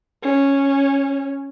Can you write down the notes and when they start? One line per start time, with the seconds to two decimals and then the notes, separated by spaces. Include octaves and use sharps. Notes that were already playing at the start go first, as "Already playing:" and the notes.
0.23 C#4